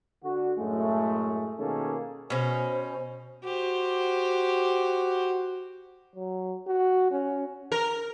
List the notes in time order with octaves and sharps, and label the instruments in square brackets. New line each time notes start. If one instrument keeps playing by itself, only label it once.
[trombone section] D3 F#4
F#2 A2 G#3 A3
B2 D#3 A#3 C#4 G#4 A4
[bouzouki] B2 C#4 [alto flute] C5
[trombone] F#4 [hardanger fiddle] G4 C5
[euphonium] F#3
F#4
C#4
[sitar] A#4